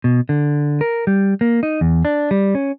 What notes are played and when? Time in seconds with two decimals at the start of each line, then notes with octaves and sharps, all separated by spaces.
0.04 B2
0.29 D3
0.81 A#4
1.07 G3
1.41 A#3
1.63 D#4
1.81 E2
2.05 D4
2.31 G3
2.55 C#4